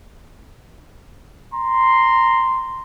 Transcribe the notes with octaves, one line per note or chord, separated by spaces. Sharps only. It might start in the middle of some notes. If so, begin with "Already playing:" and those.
A#5 C6